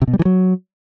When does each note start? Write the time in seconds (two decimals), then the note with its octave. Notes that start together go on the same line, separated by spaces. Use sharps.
0.02 C3
0.08 B2
0.13 G3
0.19 E3
0.25 F#3